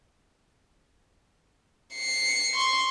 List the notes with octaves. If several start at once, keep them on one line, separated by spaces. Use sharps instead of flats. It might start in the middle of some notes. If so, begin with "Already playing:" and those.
C7 C#7
C6 C#6